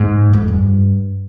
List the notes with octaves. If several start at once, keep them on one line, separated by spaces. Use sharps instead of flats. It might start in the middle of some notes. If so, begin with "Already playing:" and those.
Already playing: G#2
F2
G2